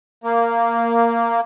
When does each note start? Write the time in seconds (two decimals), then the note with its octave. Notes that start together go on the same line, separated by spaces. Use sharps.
0.24 A#3